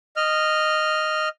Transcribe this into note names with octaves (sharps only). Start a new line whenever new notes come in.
D#5 F6